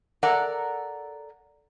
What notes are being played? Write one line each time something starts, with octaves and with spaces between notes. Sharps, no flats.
A4 A#4 D5 F#5 A#5